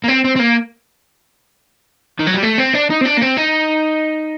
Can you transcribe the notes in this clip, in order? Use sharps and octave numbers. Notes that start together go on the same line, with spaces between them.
A#3
C4
C4
C4
A#3
D#3
F#3
G3
A3
C4
D4
D#4
C4
D4
A#3
C4
D#4